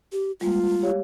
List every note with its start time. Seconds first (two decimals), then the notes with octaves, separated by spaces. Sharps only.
0.13 G4
0.41 G3 G#3 A#3 F4
0.82 G4 C#5 F5